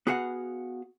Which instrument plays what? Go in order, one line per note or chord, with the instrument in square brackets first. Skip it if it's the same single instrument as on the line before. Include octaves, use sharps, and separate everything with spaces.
[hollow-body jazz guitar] B3 F#4 G#4 F5 F#5